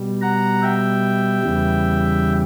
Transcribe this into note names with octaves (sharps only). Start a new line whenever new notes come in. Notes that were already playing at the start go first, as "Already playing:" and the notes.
Already playing: B2 G3
F#5 A#5
E5 G5
E2 C#3 E3 G3